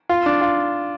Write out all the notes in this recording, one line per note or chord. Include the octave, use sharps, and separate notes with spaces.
F4
D4
F4